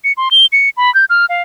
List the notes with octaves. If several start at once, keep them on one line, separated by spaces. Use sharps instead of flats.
C#7
C6
G7
C#7
B5
G6
F6
F5